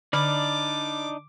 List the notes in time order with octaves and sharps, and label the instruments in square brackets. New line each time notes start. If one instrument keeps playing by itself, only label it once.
[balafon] D3 [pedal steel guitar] D4 D#4 D5 [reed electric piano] B5 F6 [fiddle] D6